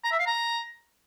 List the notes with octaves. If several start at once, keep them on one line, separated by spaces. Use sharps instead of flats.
A#5
E5
F5
A#5